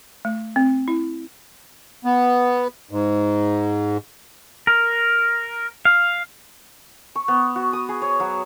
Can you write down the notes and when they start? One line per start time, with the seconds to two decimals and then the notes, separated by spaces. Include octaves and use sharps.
0.25 A3
0.56 C4
0.88 E4
2.05 B3
2.91 G#2
4.67 A#4
5.85 F5
7.15 C#6
7.28 B3
7.56 F#4
7.73 D#6
7.89 G#4
8.02 C#5
8.20 F#3